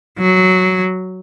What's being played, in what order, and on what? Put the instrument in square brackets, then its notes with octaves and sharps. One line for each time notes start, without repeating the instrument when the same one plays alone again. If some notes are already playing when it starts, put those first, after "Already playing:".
[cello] F#3